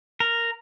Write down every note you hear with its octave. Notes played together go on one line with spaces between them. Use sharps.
A#4